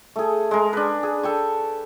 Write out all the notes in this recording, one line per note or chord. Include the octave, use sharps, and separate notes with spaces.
A3 G#4
G#3 A#4
D4 B4
G#4
A4 G5 C#6